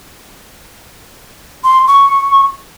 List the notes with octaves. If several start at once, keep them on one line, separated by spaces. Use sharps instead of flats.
C6
C#6